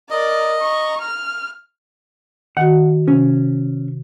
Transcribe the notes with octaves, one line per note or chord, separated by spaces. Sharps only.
A#4 D5 D#5
A#5 C#6
F6
D#3 F#4 F#5
C3 C#4